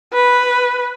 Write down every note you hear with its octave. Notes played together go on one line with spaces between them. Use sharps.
B4